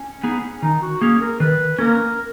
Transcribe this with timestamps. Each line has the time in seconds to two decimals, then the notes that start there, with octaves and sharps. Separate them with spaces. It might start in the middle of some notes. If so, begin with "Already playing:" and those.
Already playing: C#4
0.23 B3 D#4 G#4
0.62 D#3 D#4
0.82 F#4
1.01 A#3 C#4 G#4
1.21 A#4
1.40 D#3 B4
1.79 A#3 C#4 A#4